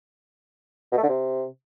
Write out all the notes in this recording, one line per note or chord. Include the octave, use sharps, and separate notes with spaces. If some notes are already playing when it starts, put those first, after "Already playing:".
B2
A3
D3
C3